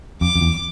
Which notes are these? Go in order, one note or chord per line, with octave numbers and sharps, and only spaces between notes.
F2 D6
F2
E2